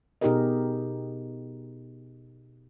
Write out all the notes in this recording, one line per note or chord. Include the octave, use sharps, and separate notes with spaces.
B2 D#4 G4 G#4 A#4 D#5